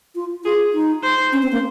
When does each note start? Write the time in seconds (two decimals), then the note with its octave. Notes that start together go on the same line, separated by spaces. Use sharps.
0.15 F4
0.44 F4 G#4
0.73 D#4
1.03 C5
1.32 C#4
1.42 C4
1.52 A#3